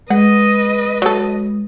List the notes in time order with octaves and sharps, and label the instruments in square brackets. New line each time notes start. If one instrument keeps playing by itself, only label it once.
[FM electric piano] G#3 [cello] B4 D#5 [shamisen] F#5
[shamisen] F#3 A4